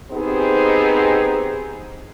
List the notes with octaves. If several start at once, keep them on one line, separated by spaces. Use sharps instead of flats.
B3 C4 D#4 G4 G#4 C5